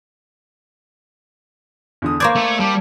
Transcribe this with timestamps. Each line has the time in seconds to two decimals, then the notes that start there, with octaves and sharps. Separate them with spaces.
2.02 E2 D3 D#6
2.20 A#3 C5 D5 C#6 D6 G#6
2.36 A3 A4
2.60 G3 A5